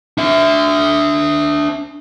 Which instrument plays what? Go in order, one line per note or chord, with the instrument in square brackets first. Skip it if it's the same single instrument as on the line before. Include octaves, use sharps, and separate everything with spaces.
[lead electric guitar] D4 E5